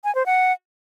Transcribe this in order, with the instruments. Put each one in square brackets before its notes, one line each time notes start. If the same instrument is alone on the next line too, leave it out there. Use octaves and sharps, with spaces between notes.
[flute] G#5
C5
F#5